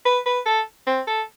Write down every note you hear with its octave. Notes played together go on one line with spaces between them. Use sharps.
B4
B4
A4
C4
A4